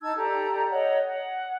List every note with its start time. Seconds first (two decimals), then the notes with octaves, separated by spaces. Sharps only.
0.01 D#4 A5 E6 G#6
0.16 G4 A4 D5 A#5
0.69 C#5 D#5 F#5
1.08 F#5